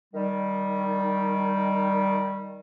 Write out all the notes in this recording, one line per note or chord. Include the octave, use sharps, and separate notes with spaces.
D#3 G3